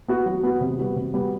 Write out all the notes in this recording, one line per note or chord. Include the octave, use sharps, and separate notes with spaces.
B3 F#4
F#3
B3 F#4
C3
G3 B3 F#4
C3
G3 B3 F#4